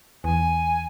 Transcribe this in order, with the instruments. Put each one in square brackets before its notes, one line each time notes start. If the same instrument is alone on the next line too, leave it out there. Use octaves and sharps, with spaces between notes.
[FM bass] E2 [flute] G#5